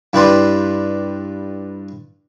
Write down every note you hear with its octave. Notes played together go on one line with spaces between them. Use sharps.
G2 E4 G4 B4 D5 C6